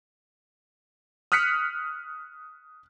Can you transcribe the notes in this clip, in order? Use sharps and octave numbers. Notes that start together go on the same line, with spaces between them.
D#6 F6 F#6 B6 C#7